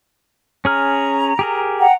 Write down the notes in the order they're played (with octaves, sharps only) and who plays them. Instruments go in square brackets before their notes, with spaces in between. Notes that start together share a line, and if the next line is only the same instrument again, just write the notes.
[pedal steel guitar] C#4 G#4 F6 [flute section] A#5
[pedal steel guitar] G4 G#4 A#4
[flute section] F#5 G5 A#5